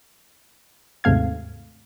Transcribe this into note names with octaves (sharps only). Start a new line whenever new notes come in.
D#2 G#2 C3 A3 F5 G#6